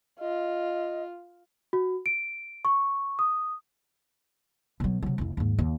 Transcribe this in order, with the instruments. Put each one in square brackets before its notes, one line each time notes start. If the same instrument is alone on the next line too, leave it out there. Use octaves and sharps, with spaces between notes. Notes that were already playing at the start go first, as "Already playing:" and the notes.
[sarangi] F4 [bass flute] D#5
[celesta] F#4
D7
C#6
D#6
[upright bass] B2 F#3
C3 F#3
F1 E4
D#2 G#2
D#2